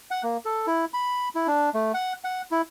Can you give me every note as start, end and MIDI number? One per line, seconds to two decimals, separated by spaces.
0.11 0.22 78
0.23 0.37 58
0.45 0.66 69
0.67 0.85 64
0.94 1.29 83
1.35 1.47 64
1.47 1.69 62
1.74 1.92 57
1.94 2.13 78
2.24 2.41 78
2.51 2.62 64